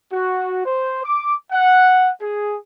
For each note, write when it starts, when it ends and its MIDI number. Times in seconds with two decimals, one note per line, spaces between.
0.12 0.63 66
0.64 1.03 72
1.04 1.34 86
1.51 2.09 78
2.20 2.56 68